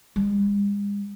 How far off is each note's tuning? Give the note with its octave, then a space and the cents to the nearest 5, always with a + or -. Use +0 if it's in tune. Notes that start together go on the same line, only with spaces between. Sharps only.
G#3 -45